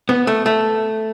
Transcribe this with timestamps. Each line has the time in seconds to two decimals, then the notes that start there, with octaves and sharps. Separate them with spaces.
0.09 B3
0.27 A3
0.46 A3